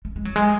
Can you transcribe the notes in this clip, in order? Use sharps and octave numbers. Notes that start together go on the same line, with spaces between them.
A3
G#3
F#3
G#3